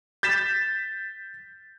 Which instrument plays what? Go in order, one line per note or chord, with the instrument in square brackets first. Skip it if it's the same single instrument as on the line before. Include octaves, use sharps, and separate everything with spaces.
[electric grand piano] G6 A6 B6 E7